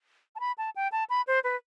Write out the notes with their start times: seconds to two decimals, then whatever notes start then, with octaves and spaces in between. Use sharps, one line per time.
0.35 A5
0.40 B5
0.58 A5
0.76 G5
0.92 A5
1.09 B5
1.27 C5
1.44 B4